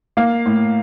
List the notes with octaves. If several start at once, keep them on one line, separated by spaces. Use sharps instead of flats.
A#3 F5
A2